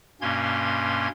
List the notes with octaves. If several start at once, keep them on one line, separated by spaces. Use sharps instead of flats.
G2 B2 A#3 C#4 C6 G#6